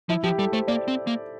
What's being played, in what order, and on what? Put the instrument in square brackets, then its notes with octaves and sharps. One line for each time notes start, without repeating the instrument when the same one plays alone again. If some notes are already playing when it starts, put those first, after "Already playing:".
[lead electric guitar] F3 [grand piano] E4
[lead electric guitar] F3 [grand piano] G4
[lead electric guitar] G3 [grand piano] A4
[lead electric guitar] A3 [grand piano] C5
[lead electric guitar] A#3 [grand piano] D5
[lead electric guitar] C4
A#3